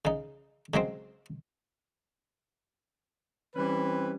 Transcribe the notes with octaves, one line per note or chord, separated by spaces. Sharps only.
C#3 D#4
C#3 F#3 G#3 C4
E3 G3 C4 C#4 B4